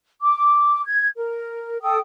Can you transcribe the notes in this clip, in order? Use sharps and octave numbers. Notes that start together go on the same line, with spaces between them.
D6
G#6
A#4
A4 G5 D#6